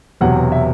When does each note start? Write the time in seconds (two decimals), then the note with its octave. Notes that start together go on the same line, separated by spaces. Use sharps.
0.21 E1 E2 C3 F#3 F#5
0.52 E5